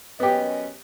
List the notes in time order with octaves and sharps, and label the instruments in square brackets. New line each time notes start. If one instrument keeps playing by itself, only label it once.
[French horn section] F#2 C#4 D#5 [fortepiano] B3 G4